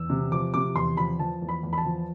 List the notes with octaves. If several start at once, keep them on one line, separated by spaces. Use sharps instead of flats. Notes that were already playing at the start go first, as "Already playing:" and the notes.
Already playing: E2 E6
C3
F3 D6
C3 D6
E2 C6
F3 B5
F3 A5
E2
B5
E2
B5
A5
F3